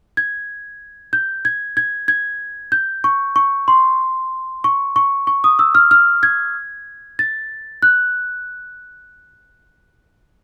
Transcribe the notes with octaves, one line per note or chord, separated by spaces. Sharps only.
G#6
G6
G#6
G#6
G#6
G6
C#6
C#6
C6
C#6
C#6
C#6
D#6
E6
F6
F6
G#6
A6
F#6